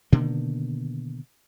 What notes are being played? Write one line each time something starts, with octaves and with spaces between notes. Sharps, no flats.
B2 D3 D#3 A#3